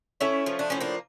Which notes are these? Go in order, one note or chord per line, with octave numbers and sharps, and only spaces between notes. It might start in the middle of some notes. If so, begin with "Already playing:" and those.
A3 C#4 E4
F3
D4
A2 C#4
A#3 D4